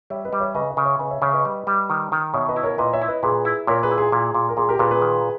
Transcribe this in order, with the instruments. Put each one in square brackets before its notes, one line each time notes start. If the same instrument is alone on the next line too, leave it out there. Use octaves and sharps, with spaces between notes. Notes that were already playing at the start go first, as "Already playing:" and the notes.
[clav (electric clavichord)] G3 [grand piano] C#5 E5
[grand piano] B4 D#5
[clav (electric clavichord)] G3
[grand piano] C#5 E5
[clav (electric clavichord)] C#3 [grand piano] B4 D#5
[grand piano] B4 D#5
[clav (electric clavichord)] C#3
[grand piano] C#5 E5
[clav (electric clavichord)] C#3 [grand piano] B4 D#5
[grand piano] C#5 E5
[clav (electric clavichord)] C#3 [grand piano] C#5 E5
[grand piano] B4 D#5
[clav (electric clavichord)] G3
G3
D#3
D#3
[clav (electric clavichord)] B2 [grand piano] C#5 E5
[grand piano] B4 D#5
[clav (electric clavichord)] E4
[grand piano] A#4 C#5
[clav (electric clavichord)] A#2 [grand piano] B4 D#5
[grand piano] C#5 E5
[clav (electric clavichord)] E4
[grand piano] B4 D#5
[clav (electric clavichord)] A#2 [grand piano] G#4 B4
[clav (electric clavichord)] E4
[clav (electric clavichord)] A#2 [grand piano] A#4 C#5
[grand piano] G#4 B4
[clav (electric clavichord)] E4
[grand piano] G#4
[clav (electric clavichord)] A#2 [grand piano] G#4
[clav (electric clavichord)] A#2
[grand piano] A#4
[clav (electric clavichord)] A#2 [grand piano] G#4
[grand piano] G4 A#4
[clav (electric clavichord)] A#2 [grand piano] G#4 B4
[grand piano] G#4 B4
[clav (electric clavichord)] D#3